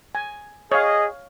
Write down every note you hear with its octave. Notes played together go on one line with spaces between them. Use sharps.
G#5
G#4 C#5 D#5 F5